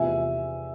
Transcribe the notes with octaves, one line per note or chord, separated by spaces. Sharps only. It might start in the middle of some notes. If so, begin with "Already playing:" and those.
Already playing: E2 C3 F3 A3 E5 G#5